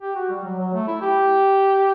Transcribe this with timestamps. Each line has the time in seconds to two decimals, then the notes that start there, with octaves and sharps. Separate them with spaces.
0.01 G4
0.15 F#4
0.30 G3
0.45 F#3
0.59 F#3
0.73 A3
0.87 E4
1.02 G4